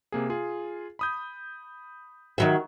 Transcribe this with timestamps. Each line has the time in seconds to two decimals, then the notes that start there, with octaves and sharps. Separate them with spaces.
0.12 C3 A#3 G#4
0.29 F4 G#4
0.99 B5 D#6 G6
2.38 D#3 F#3 E5